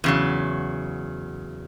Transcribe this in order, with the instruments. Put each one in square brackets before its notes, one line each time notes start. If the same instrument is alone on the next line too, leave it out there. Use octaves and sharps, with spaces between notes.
[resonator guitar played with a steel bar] E2 C#3 F#3